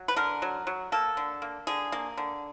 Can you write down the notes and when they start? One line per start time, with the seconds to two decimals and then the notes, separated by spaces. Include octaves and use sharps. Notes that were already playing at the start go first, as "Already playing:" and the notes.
Already playing: F#3
0.08 B4
0.16 D3 A#4
0.42 F#3
0.67 F#3
0.92 A#3 A4
1.17 D3
1.42 A#3
1.67 D3 G#4
1.92 A#3
2.17 D3